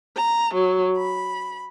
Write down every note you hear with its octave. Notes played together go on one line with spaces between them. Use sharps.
A#5
F#3
B5